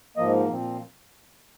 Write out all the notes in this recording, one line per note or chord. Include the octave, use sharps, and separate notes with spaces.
G#2 F3 A#3 D#5
A#2 F3 C4